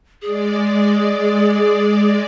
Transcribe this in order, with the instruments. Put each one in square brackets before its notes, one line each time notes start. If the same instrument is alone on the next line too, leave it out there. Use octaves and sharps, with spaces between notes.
[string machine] G#3 D5 [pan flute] G#4